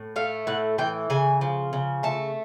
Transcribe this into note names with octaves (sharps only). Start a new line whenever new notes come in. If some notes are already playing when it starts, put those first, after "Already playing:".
Already playing: A2
A3 F5
A2 F#5
E3 G5
C#3 G#5
F3
C#3
A3 A5